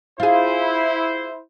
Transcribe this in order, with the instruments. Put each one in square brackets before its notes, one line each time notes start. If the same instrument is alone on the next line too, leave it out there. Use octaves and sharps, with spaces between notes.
[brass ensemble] E4 C5 [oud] F4 G#4